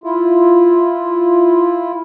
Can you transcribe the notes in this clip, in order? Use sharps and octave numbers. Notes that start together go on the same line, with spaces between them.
E4 F4